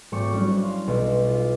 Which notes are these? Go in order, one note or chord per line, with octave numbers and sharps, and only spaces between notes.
G#1 A3 G5 C#6 D6 C#7
F#3 G3 C#4 D4 E4
F5 C6
B1
F4